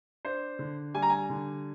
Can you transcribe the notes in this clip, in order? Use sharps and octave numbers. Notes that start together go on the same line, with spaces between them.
D4 C5
D3
G3 G#5
A#5
G#5
D3